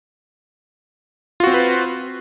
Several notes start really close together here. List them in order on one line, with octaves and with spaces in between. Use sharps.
F4 F#4 C4 C5 B4